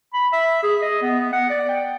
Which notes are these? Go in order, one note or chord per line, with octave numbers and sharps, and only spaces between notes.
B5
E5
G#4
D#5
B3
F#5
D5
G5